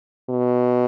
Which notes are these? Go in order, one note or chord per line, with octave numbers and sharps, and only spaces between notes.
B2